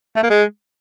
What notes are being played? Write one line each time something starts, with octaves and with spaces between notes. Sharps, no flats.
A3
A#3
G#3